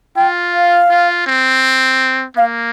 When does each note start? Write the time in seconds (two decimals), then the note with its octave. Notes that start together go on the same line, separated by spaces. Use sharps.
0.16 F4 G5
0.53 F5
0.89 F4
1.27 C4
2.37 A#3 F5